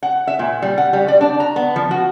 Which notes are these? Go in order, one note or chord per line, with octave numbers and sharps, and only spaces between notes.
F#5
E5
A#2
G3
F#5
G3
D5
D4
A#5
B3
F3
F#4